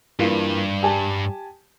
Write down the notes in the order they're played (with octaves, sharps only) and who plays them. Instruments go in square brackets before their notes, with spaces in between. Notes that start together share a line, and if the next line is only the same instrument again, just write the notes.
[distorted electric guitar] G2 [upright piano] E3 A#3 F4
[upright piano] G4 G#5 A5